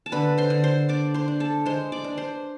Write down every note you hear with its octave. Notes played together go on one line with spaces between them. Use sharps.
A5
D3 B4 B5
C5 C6
D3
C5 C6
D4 D5 D6
C5 C6
D4
A4 A5
G#3 C5 C6
D5 D6
D4
C5 C6